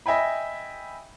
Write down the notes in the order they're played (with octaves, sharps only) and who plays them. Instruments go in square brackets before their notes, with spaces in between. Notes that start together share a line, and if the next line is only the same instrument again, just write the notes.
[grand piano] D#5 E5 G5 G#5 B5